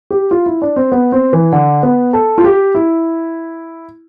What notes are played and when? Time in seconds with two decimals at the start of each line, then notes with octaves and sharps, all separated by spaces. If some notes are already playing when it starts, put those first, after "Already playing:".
0.11 G4
0.31 F4
0.46 E4
0.62 D4
0.76 C4
0.92 B3
1.12 C4
1.33 E3
1.52 D3
1.83 B3
2.13 A4
2.38 F4
2.44 G4
2.75 E4